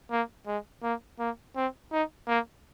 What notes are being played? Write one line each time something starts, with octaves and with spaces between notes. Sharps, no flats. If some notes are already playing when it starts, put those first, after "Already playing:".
A#3
G#3
A#3
A#3
C4
D#4
A#3